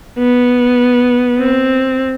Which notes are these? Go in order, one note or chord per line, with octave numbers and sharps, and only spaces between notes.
B3
C4